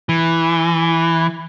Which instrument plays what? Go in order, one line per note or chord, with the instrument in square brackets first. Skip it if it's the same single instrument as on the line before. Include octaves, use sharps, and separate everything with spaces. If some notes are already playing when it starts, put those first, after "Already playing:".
[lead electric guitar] E3